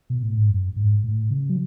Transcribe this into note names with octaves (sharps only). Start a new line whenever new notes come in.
B2
A2
G#2
F#2
G#2
A2
C#3
F#3